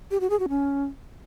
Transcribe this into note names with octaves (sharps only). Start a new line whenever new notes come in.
G4
F#4
G#4
F#4
C#4